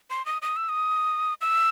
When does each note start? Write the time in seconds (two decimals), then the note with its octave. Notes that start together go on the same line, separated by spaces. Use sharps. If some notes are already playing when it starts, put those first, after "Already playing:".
0.10 C6
0.26 D#6
0.42 D#6
0.56 E6
0.69 D#6
1.41 E6